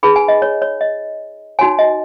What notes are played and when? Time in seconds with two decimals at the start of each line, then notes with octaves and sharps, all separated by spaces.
0.03 D#4 G#4 B4 B5
0.16 G#5
0.28 D#5
0.42 C#5
0.62 C#5
0.81 D#5
1.59 D#4 F#4 C#5 G#5
1.79 D#5